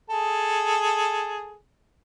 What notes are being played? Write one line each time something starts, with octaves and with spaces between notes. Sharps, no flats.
G#4 A4